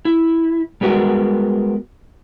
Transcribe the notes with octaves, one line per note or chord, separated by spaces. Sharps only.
E4
G3 G#3 B3 F#4 A#4